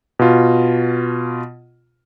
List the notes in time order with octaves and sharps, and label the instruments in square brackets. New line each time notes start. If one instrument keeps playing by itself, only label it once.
[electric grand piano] B2 F4